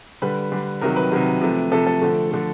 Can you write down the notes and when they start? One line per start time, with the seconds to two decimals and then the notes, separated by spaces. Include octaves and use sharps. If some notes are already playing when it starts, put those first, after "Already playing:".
0.22 D3 G3 B4
0.52 D3 G3
0.81 C3 D#3 F#3 A#4
0.96 B4
1.12 C3 D#3 F#3
1.41 C3 F3 A3
1.71 C3 F3 A3 A4
1.87 A4
2.01 D3 F3 A3
2.32 D3 F3 A3